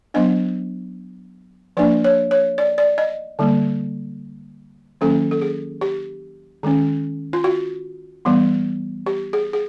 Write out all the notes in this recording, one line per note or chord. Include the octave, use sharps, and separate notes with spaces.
F#3 B3 D4 D#5
F3 A#3 D4 D5
C#5
C#5
D5
D5
D#5
D3 G3 A#3
D#3 F#3 A#3 C#4 A4
A4
G#4
G4
D#3 G#3 C#4
F4
F#4
E3 G3 B3
G4
G#4
G#4